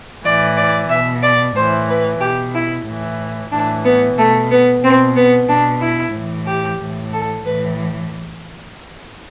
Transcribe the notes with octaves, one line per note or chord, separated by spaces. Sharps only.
A2 E3 D5
D5
B2 E5
D5
A2 E3 C5
B4
B2 G4
E4
A2 E3
A2 E3 D4
B3
B2 A3
B3
B2 C4
B3
B2 D4
E4
A2 E3
G4
A2 E3
A4
A2 E3 B4